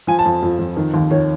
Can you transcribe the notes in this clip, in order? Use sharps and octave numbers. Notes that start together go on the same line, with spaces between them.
F3 G#5
A5
F2
F2
F2
D#3
D#2
D#3 C#5